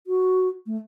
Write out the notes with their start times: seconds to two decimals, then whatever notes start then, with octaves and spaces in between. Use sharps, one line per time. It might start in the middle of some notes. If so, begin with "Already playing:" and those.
0.07 F#4
0.66 A3